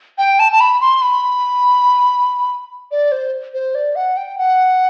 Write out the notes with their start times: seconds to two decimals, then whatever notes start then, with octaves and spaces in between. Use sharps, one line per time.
0.18 G5
0.39 A5
0.52 A5
0.60 B5
0.81 C6
1.02 B5
2.91 D5
3.12 C5
3.54 C5
3.75 D5
3.96 F#5
4.17 G5
4.38 F#5